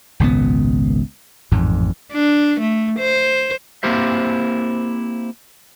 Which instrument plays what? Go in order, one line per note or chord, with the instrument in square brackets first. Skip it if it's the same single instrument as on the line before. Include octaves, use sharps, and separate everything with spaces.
[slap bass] G#1 C#2 A#2 B3
A1 F2 G#2
[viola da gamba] D4
A3
C5
[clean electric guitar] A#3 C4 E4 G4 C5 E5